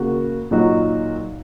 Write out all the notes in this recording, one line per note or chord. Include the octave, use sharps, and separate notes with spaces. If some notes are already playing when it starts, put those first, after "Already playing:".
Already playing: C#3 A#3 F#4
A#2 F#3 D#4 F#4